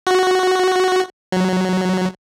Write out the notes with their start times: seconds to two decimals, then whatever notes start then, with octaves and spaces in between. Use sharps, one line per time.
0.07 F#4
1.32 F#3